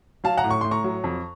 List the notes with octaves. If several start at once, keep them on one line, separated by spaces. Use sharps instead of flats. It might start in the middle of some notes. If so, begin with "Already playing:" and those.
F#3 F5 A5
F#5 A#5
A2
C#6
A2 C6
A#5 C#6
F#3
F2